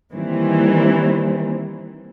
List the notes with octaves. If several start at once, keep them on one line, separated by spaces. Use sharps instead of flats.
D#3 E3 G3 A#3 C4